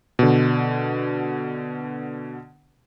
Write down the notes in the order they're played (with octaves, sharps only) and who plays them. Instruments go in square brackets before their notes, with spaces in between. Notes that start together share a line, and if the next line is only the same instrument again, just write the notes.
[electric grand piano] B2 D3